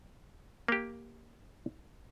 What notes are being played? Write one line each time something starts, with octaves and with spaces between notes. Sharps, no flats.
A#3 G4